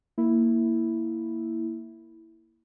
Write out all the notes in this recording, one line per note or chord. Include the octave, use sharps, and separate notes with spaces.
A#3 E4